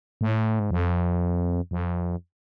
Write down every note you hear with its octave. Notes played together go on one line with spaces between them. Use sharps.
A2
G#2
F2
F2